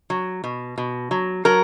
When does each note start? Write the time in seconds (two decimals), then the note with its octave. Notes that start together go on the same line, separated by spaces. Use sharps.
0.10 F#3
0.44 B2
0.78 B2
1.11 F#3
1.45 F#3 A#4